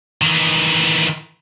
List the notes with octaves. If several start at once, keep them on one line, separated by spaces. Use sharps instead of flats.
D#3 E3